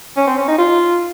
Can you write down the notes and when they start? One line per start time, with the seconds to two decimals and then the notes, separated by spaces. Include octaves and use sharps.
0.17 C#4
0.27 C4
0.37 C#4
0.48 D#4
0.58 F4